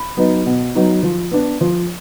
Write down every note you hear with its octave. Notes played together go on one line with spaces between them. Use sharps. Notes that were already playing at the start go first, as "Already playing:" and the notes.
Already playing: B5
F#3 B3 D#4
B2
F#3 B3 D#4
F3
B3 D4
F3